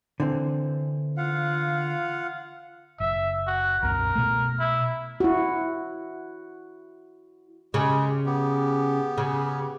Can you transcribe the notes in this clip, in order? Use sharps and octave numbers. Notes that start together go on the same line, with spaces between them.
D3 E3 C4
F4 F5 F#5
F#1 E5
F#4
C2 F#2 A#4
B2 A3
E4
E4 F#4
C#3 G#3 G4
B3 G4
C#3